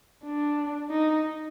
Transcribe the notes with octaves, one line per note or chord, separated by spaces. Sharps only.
D4
D#4